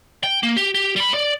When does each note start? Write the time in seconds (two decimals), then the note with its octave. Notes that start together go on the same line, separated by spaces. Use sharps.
0.24 G5
0.43 A#3
0.57 G4
0.74 G4
0.96 G3 B5
1.14 D5